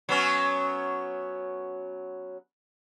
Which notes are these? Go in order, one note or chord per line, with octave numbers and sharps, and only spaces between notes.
F#3 B3 C#4